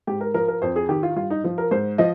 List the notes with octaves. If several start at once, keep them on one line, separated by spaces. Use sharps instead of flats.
G#2 G4
A#4
F3 A#4
A#4
F2 C5
G#4
D#3 G4
F4
G2 F4
D#4
F3
A#4
G#2 C5
F3 D#5